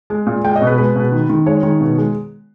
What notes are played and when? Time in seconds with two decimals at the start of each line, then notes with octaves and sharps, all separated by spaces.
0.10 G#3
0.27 A#2
0.45 G#3 G5
0.56 D#5
0.62 B2
0.67 B4
0.78 G#3 B4
0.96 B2
1.12 D#3
1.30 D#3
1.46 G#3 C#5
1.63 D#3
1.81 B2
1.98 G#3